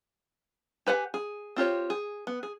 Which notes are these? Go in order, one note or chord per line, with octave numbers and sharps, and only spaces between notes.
G4 B4 F#5 G#5
G#4
C4 F4 G4 C#5
G#4
B3
G#4